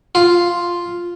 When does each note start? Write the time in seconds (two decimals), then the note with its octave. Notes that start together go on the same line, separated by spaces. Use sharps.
0.15 F4